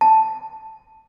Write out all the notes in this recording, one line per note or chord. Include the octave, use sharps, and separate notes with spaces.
A5